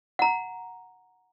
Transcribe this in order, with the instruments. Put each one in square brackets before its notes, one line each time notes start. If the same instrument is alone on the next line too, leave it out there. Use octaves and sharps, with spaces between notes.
[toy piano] F#5 A#5